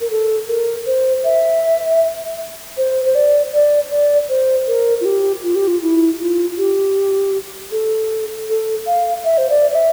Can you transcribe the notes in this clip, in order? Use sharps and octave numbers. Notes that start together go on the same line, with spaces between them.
A#4
A4
A#4
C5
E5
C5
C5
D5
D5
D5
C5
A#4
F4
G4
F4
G4
F4
E4
F4
G4
A4
A4
F5
E5
C5
D5
D5
E5